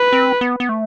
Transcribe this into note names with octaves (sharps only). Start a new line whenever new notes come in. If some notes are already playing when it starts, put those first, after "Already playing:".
Already playing: B4
C4
B3
B3
A3